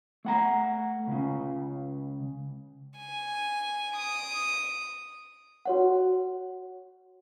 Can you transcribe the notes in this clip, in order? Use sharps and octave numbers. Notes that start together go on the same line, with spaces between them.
A3 F#5 A#5
C#2 C#3
G#5
D#6 D7
F#4 C#5 F#5